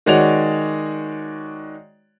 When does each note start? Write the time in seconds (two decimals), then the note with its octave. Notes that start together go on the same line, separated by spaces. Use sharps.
0.06 D#3 G#3 F#4 C#5 D5 F7